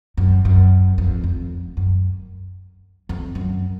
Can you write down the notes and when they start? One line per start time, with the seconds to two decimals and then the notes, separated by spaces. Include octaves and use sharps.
0.17 F#2
0.45 F#2
0.98 F2
1.24 F2
1.77 F#2
3.09 F2
3.35 F#2